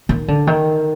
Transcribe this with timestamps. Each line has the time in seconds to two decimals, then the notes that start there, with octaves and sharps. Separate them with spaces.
0.09 D#3
0.28 D3
0.47 D#3